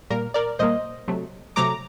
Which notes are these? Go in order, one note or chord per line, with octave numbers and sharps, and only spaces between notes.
A#2 G3 A#3 A#4
A#4 D5
A#2 G3 A#3 C5 D#5
C3 F#3 A3
C3 F#3 A3 A#5 D6